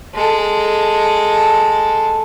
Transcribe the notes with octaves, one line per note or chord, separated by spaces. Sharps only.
G#3 A4